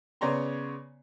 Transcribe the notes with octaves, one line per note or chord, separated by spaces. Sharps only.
C#3 B3 C#5 D5 A#5 C6